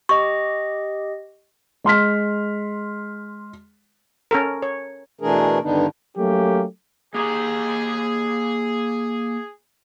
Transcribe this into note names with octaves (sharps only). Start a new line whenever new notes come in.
G4 D#5 C#6
G#3 C6 F6 B6
C#4 A4 A#4
C#5
B2 E3 A3 D4 G#4 A#4
G2 D3 D#3 B3 D4 D#4
F#3 A3 A#3 C#4 G4
A#3 G4 G#4 A#5